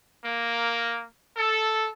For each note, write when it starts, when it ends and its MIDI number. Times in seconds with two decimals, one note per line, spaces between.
0.24 1.02 58
1.36 1.87 69